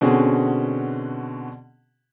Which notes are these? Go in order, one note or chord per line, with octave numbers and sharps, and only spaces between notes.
B2 D3 C4 C#4 F#4 G#4